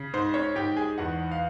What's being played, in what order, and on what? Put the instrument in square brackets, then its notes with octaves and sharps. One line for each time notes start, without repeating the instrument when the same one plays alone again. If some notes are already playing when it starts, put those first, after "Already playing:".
Already playing: [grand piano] C#3
G#2 C5
C#4 C#5
G#2 G4 G5
G#4 G#5
E2 F#4 F#5
F5